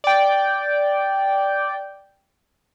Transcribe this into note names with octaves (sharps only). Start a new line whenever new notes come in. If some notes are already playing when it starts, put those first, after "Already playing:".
D5 G5